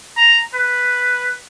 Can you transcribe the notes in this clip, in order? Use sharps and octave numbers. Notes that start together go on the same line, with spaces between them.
A#5
B4